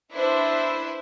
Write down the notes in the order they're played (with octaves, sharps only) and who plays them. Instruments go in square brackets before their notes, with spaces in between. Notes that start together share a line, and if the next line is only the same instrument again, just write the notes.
[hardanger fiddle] D4 [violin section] E4 C5 [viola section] B4 E5